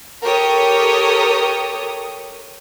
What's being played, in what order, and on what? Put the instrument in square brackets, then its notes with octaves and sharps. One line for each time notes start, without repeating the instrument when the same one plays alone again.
[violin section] G4 A4 A#4 C#5 D#6